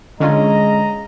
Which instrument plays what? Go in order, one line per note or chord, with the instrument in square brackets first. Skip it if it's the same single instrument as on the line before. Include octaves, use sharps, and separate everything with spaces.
[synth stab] D3 C#4 F4 [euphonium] G#3 [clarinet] D#5 [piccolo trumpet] A#5